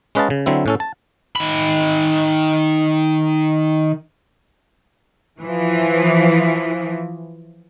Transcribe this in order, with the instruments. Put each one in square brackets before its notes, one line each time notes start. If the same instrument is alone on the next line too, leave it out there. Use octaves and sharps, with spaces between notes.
[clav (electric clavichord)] G#3 C#4 B4 D#5 F5 A5
C#3
D3 F#3 C4 E4
A2 C#4 A4
A5
[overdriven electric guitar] D#3 B5
[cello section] E3 F3